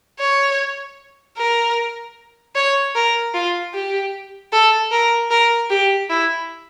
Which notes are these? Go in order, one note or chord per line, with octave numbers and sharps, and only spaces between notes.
C#5
A#4
C#5
A#4
F4
G4
A4
A#4
A#4
G4
E4